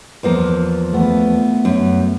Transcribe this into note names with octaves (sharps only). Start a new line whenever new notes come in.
E2 F3 A#3
A3 B3
F#2